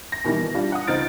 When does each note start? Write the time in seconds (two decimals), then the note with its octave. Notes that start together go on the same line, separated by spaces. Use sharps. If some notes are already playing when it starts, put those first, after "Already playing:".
0.12 A#6
0.24 B2 D#3 E3 G3
0.36 B2
0.55 G3 D4 F4
0.72 F#5 D#6
0.87 C#2 D#4 C5 F6 A6 D7